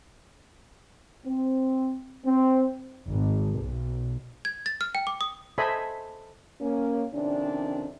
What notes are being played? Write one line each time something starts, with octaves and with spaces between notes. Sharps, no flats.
C4
C4
G#1
B1
G#6
A6
F6
G5
D6
D#6
A4 C5 D#5 E5 G#5 B5
A#3 C#4
F2 C3 D#3 C#4 D4